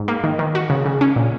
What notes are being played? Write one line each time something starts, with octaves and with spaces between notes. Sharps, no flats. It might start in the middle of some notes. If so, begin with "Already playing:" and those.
Already playing: G#2
A#3
D#3
D#3
F#4
C#3
C#3
C#4
A#2